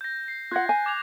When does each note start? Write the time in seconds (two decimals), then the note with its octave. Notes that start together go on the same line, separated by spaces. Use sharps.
0.01 G6 A#6
0.28 C7
0.51 F4 F#5 F#6 G#6 A#6
0.69 G#5
0.86 D6 G#6 F7